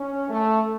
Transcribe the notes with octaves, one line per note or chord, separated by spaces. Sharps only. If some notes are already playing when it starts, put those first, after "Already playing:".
Already playing: C#4
A3